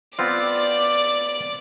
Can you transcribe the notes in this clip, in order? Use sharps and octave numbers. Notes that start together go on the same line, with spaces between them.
B3 C4 F4 D5 D6